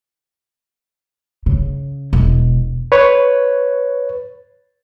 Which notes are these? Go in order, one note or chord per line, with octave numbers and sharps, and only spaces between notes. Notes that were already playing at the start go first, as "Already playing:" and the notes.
C#3
E1
B4 C#5